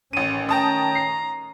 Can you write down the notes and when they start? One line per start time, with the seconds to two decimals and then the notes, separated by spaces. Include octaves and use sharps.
0.13 A1 D#3 A3 C#4 D#7
0.49 G5 A5 A#5 D#6
0.95 C7